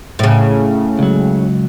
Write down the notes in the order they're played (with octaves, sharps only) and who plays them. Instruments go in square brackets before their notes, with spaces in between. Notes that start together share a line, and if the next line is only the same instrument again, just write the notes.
[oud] A2 C#3
[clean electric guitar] C#2 F#3